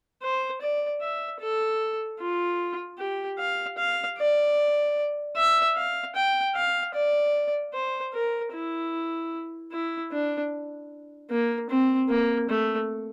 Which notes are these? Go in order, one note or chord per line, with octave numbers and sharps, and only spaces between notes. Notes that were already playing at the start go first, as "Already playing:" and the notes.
C5
D5
E5
A4
F4
G4
F5
F5
D5
E5
F5
G5
F5
D5
C5
A#4
E4
E4
D4
A#3
C4
A#3
A3